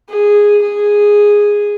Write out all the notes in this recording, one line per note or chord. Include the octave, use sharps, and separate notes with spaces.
G#4
G#4